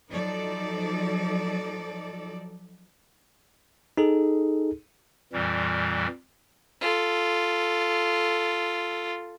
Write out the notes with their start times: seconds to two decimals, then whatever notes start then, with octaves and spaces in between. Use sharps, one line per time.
0.11 F3 F#3 D#4 A4 D5
3.98 D#4 G#4 A4
5.33 F2 A#2 E3 G3
6.81 F4 A4